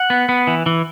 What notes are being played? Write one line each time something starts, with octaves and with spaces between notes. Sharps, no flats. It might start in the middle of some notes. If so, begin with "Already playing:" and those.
Already playing: F#5
B3
B3
E3
E3